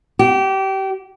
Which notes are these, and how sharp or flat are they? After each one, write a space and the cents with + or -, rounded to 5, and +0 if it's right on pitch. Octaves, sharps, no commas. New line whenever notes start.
G4 -25